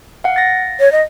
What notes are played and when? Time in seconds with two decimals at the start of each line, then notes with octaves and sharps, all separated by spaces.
0.24 F5 F#5
0.36 A6 A#6
0.80 C#5
0.92 D#5